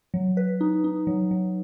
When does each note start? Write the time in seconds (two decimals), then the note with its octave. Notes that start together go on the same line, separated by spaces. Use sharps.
0.14 F#3
0.37 B4
0.61 D#4
0.84 D#4
1.07 F#3
1.31 F#3